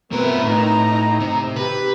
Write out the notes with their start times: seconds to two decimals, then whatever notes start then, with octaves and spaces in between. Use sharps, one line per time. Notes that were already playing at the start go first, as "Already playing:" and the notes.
0.12 B2 C4 A#4 B4 E5
0.43 A2 D#4 A#5
1.20 C3
1.56 G4 B4